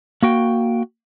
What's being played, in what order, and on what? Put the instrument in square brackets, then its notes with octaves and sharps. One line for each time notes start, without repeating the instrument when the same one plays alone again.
[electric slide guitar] A#3 F#4 G5